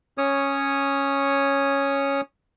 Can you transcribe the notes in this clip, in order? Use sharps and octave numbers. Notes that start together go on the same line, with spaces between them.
C#4 C#5 D#6